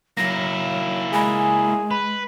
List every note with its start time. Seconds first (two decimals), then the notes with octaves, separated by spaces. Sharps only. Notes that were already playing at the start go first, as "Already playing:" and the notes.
0.17 F#3 A#3 E4 A#6
1.13 G#3 G#4 G#5 B5
1.91 B4 B5